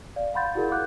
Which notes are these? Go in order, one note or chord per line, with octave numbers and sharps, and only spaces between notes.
D5 F5
F5 F#5 B5 C6 G6 A6
E4 F#4 G#4 A#4 F#5
F5 F#5 D6 F#6 G6